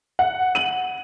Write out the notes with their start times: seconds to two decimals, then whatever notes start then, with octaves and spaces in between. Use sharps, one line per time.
0.19 F#5
0.55 D#7 F#7